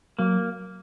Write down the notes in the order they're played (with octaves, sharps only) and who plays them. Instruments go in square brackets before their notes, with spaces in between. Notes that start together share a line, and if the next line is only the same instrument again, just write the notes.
[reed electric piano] F#3 [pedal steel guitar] A#3